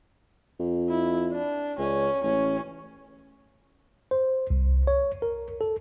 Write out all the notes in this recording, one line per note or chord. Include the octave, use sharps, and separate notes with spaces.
F2
E4
D4
C#2 C#4
A1 C#4
C5
C2
C#5
A#4
A4